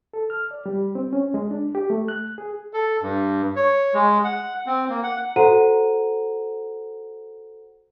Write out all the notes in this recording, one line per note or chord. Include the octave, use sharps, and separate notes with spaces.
A4
F6
D5
G3
C4
C#4
G#3
D4
G4
A3
F#6
G#4
A4
G2
C#5
G#3
F#5
C4
A#3
F#5
F#4 A4 C5 F#5 A#5 D#7